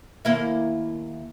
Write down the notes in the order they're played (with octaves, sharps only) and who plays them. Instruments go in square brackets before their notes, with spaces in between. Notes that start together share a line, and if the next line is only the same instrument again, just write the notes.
[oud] D#2 A#3 E4